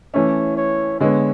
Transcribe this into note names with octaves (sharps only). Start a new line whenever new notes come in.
E3 A3 C#4 C#5
C#5
D3 G#3 B3 C#5